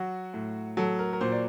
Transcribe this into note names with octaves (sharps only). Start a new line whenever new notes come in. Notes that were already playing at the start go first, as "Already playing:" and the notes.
Already playing: F#3 F#4
A2
F#3 A4
A#4
A#4
A#2 C5
D5